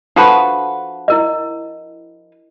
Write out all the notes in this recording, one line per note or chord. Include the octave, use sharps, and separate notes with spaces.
F3 D4 F#4 A4 B4 A5
E4 A#4 D#5